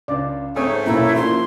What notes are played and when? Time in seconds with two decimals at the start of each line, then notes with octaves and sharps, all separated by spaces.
0.08 C#2 D4 D5
0.56 G#2 A3 C4 C#5 G#5 D#6 G6
0.86 B1 A#3 C#4 E4 A#5
1.16 F3 A#3 D4 E4 C6